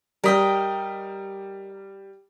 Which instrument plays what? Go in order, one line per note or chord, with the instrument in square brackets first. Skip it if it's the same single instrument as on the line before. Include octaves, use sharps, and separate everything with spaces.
[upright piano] G3 B6 [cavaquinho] A#4 D#5 G5